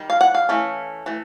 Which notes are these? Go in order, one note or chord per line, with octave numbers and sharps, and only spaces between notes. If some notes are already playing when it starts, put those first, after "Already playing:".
Already playing: D#3 G3
F5
F#5
F5
E3 A3 C#4
E3 A3